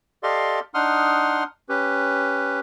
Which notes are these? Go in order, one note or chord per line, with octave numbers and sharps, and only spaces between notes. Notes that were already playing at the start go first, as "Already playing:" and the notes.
G4 A4 D5 D#5 F5 C6
D4 D#4 F#5 C6 D#6 F6
C#4 G4 B4